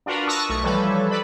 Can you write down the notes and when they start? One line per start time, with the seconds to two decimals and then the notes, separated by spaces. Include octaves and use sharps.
0.06 D4 F4 F#4 A#4 B4
0.27 A5 C#6 D#6 E6 F#6 A#6
0.49 B1 A3 C#6
0.64 E3 F3 G3 A4 B4 C#5
1.10 A4 B4 D5 B5